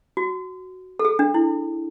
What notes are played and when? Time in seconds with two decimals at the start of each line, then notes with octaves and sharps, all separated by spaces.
0.17 F#4
0.99 A4
1.05 G#4
1.19 D4
1.34 E4